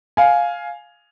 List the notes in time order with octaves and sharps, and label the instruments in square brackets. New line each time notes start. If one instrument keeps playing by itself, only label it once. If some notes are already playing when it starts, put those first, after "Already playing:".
[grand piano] F5 G#5